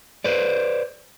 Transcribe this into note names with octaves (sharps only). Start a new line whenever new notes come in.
B4 C5 D5